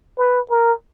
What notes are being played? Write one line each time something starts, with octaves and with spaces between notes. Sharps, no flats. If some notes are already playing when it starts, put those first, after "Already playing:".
B4
A#4